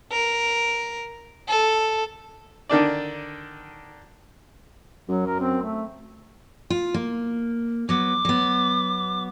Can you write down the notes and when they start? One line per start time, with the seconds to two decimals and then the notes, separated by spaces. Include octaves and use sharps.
0.12 A#4
1.49 A4
2.69 D3 D#3 D4 D5
5.09 F#2 F#3
5.26 A#4
5.40 C4
5.62 A3
6.70 F4
6.94 A#3
7.89 F#3 B3 D6
8.25 F#3 B3